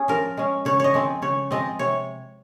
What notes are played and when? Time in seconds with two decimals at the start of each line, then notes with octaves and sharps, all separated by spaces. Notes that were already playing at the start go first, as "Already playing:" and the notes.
Already playing: C#4 G#4
0.08 F3 A#4
0.37 G#3 C#4
0.65 C#3 C#5
0.80 C#5 D#5
0.94 F3 G#3 C4
1.22 C#3 C#5
1.51 F3 G#3 C4 D#5
1.79 C3 C#5